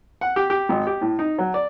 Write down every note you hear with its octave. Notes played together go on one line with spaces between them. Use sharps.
F#5
G4
G4
G#1
G4
A2
D#4
F#3
D5